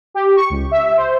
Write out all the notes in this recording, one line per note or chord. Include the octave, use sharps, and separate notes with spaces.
G4
C#6
C#2
E5
C5